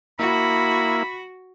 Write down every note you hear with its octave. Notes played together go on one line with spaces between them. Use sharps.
A#3 E4 F#4 B5